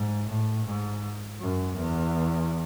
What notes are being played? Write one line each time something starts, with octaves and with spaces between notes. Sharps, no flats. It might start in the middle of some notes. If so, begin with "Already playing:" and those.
Already playing: G#2
A2
G#2
F#2
E2